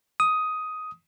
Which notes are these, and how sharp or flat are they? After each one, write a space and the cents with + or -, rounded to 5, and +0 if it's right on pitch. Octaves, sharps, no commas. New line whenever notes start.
D#6 +10